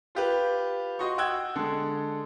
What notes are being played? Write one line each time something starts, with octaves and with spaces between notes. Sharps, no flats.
F4 G4 B4
F#4 D#5 C6 C#6
F#5 G5 E6 F#6 G#6
D3 G#3 A4